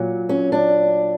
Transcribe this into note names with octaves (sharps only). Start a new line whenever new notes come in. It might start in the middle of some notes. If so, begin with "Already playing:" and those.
Already playing: A#2 F#3
C#4
D4